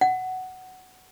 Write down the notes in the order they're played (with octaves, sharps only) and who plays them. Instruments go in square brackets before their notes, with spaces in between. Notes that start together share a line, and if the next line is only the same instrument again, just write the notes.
[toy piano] F#5